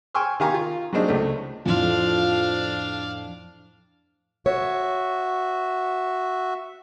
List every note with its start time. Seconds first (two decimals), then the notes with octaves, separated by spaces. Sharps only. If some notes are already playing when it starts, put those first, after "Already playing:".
0.15 G5 G#5 C6 C#6 E6 F6
0.40 D#3 G4 F5 G#5 A#5 C#6
0.54 F4
0.93 F#3 G#3 A#3 C4 D4 D#4
1.08 C#2 A3
1.66 F2 A2 F3 D4 F5 C6
4.46 F#4 C#5 E5